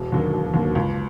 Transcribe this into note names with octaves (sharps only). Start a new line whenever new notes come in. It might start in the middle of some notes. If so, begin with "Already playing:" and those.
Already playing: E1
D#2 D3 F#3 A#3
E1
D#2 D3 F#3 A#3
C#2